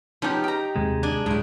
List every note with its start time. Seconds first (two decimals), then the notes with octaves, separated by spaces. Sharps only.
0.22 F3 B3 C#4 D#4 G4
0.44 G5 A#5
0.76 D#2 C3 G#3
1.03 D4 G#5
1.26 D1 A2 G#3 E4